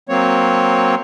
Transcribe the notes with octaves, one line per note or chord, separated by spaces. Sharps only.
F#3 A#3 C4 C#5